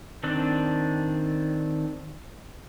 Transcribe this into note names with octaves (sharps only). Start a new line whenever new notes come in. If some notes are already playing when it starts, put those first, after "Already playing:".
D#3 C4 D4